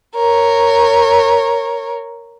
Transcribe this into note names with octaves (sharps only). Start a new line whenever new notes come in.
A#4 C#5